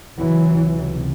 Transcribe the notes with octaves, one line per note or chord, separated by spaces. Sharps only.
C#2 C3 E3 F#3